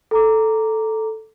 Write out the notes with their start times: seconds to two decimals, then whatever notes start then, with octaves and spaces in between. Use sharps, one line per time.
0.11 A4 A#5 D6